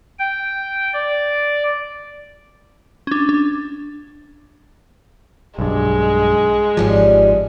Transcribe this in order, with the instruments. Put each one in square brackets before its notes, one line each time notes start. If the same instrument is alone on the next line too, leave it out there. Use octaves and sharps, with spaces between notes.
[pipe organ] G5
D5
[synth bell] C#4 D4
D4
[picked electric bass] B1 G2 [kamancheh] G#3
[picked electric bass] G#1 G#2 F3 [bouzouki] G3 B3 C#4